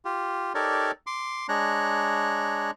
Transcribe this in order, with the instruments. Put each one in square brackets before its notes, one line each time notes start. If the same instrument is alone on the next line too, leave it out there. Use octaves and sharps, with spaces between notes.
[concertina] F4 G4
D#4 G4 A4 A#4 C#5 D5
C6 D6
G#3 D4 C#5 A#5 F#6